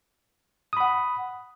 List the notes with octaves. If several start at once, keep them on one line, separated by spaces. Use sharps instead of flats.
F#5 B5 D#6